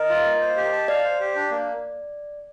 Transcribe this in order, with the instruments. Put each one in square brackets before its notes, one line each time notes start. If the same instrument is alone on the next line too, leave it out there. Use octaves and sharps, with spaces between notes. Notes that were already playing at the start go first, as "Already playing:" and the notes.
Already playing: [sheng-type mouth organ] A#4 [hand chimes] D#5
[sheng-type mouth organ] F4
A#3
C5
G4
A5
[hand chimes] D5 [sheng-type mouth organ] F5
[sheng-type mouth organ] C5
G4
D4
A#3